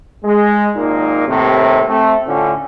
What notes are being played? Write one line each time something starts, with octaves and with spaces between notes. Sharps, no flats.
G#3
G#1 A#2 A#3 D#4
D#2 A2 C3
A3 C4
A2 D3 C#4 F4